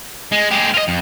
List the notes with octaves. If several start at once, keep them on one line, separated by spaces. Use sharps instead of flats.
G#3
G#3 G4
F4 D#5
F2